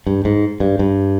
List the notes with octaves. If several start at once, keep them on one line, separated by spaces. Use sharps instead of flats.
G2
G#2
G2
G2